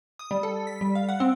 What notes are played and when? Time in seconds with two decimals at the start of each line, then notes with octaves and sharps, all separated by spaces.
0.19 D#6
0.31 G3
0.43 A4
0.67 B6
0.81 G3
0.95 F5
1.09 F#5
1.20 C4